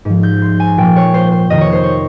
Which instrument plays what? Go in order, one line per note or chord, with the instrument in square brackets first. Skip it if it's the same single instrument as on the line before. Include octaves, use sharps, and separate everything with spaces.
[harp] G#2 F3
G6
C6
G#5
A#2 F3 G5
C#5
C5
C5
F2 C3 D#3 D#5
C#5
C5
C#5